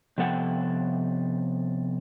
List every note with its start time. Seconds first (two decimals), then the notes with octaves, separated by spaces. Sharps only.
0.18 C3 F3 B3 A4 F#5 G5